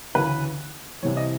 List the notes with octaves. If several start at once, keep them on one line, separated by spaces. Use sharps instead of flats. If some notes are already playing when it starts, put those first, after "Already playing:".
D2 C#3 E3 B4
C2 C3 E3 C#5
D#5